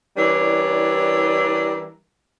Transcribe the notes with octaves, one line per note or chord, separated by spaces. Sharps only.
E3 G3 C#4 D4 E4 A#4